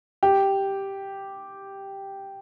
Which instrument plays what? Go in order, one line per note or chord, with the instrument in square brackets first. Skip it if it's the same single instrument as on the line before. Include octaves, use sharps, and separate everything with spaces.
[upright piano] G4